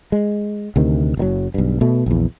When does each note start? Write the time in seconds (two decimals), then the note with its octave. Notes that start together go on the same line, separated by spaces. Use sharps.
0.12 G#3
0.76 D2 C3 D#3
1.17 F#1 A#2 F#3
1.54 B1 G2
1.81 B2 A3
2.06 A#1 E2